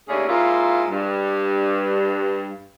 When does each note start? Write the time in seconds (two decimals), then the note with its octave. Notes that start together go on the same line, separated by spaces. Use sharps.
0.08 D#2 D3 A3 C#4 G#4
0.28 G#2 A#3 E4 F4
0.90 G2